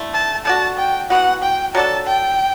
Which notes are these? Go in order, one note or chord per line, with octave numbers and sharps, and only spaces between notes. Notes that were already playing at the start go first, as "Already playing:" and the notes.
Already playing: D3 A3 E4
A5
A3 D4 F#4 A5
G5
E3 B3 F#4 F#5
G5
F#3 A3 D4 A4 A5
G5